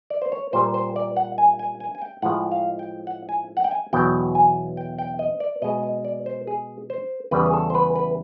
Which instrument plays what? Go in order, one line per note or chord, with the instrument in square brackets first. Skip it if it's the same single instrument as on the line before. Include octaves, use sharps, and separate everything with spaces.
[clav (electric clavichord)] D5
C5
C#5
A#2 G3 C5
C5
D5
F#5
G#5
G#5
G#5
G#5
G5
A2 F3 G#3 F#5
F5
G5
F#5
G#5
F#5
G5
G#5
E2 B2 F#3 G5
G#5
G5
G5
D#5
D5
B2 G#3 D#5
D#5
D5
C5
G#4
C5
E2 C#3 E3 G3 B4
G#4
A4
C5
B4
B4